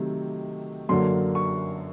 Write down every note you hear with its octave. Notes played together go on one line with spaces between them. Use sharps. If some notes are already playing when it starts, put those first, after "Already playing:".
Already playing: C3 D#3 F#3 A3
F#2 D3 F#3 A#3 C6
C#6